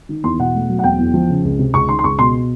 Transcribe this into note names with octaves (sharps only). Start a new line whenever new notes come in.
D#3
E2 C6
B2 F#5
A3
F#3
F#5
E1 G5
E2
F3
C#3
C#2
C3
C#2 C#6
D#3 C6
C6
C#2 C#6
B2 C6